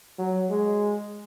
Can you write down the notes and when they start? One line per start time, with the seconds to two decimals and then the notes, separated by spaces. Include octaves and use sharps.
0.19 F#3
0.50 G#3